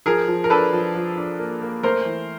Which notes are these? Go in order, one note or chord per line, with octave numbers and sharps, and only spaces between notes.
F3 G#4 A#4
F3
A#4
D4 A4 B4
F3
F3
D4
A#3
A#3
A3 A#4 C5
E3